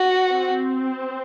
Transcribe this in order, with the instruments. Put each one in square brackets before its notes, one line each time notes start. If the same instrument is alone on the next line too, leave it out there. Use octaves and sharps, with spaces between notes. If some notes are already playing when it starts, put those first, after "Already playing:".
Already playing: [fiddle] F#4
[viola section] C4